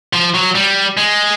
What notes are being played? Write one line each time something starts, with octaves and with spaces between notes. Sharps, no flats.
F3
F#3
G3
G#3